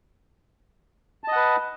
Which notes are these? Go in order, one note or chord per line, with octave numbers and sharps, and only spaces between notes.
B4 D#5 F#5 A5